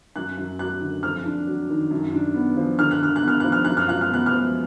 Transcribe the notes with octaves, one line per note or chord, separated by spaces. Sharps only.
F#2 F#6
F#2
F#3 F#6
D3
F2 F6
D4
F#3
D#3
F#2
D4
B3
F3
D3 F6
F#6
D3 F6
F#6
B3
F6
F3 F#6
F6
F#2 F#6
F6
F4 F#6
F6
B3 F#6
F6
F3